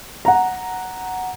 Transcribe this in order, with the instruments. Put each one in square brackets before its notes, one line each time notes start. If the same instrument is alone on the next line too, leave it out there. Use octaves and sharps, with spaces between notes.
[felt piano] F#5 A#5